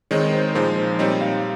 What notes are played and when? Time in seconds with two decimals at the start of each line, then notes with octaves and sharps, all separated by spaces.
0.11 D#3 G#3 C4 D#4 C#5
0.33 C5
0.54 A#2 F3 G#3 D#4 C5
0.99 A#2 G3 C4 D#4 C#5
1.21 F5